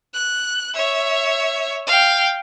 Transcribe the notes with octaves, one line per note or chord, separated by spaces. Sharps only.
F#6
C#5 E5
F5 G5